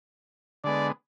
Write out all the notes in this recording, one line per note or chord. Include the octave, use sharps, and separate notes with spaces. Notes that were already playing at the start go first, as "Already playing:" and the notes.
D3 G#3 B3 D5